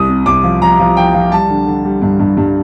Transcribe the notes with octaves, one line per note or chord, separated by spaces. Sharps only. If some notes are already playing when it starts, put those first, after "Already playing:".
Already playing: C2 D#6
C3
C2 D6
F3
F3 A#5
F3
F3 G5
F3
G3 A5
D3
D3
G3
G2
G2
G2